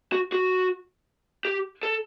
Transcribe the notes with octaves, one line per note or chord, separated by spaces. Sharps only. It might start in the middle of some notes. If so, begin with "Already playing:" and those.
F#4
F#4
G4
A4